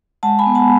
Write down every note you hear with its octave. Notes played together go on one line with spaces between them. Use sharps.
G#3 F#5 A5
G#5 B5
B3
F#5 A5